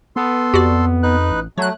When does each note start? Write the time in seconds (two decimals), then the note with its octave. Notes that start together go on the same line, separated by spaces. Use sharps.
0.16 B3 A4 C6
0.54 F2 F#4 G4 D5
1.03 D#4 B4 F#6
1.30 A1
1.58 F#3 A3 C#5 F#6